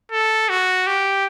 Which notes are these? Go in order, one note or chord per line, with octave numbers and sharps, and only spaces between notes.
A4
F#4
G4